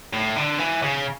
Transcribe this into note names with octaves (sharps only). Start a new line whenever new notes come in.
A2
D3
E3
C#3